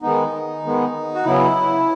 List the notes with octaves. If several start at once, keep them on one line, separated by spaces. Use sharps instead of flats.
D#3 G#3 B3 D#4
D#3 G#3 B3
F#4
C#3 F#3 B3 E4